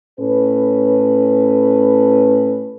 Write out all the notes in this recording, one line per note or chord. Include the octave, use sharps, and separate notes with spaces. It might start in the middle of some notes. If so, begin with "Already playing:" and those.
A2 C#4 A4 B4